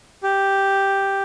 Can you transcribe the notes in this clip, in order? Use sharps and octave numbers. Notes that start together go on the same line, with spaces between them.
G4